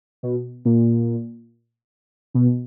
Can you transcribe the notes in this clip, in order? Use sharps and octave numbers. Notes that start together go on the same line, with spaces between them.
B2
A#2
B2